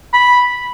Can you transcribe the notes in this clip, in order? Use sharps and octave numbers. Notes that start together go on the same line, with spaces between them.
B5